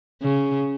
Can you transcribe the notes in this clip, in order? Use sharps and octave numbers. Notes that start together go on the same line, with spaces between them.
C#3